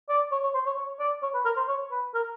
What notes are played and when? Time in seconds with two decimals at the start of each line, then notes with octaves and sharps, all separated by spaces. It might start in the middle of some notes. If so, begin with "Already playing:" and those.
0.09 D5
0.31 C#5
0.43 C#5
0.54 C5
0.66 C#5
0.77 C#5
1.00 D5
1.23 C#5
1.34 B4
1.45 A#4
1.57 C5
1.68 C#5
1.91 B4
2.14 A#4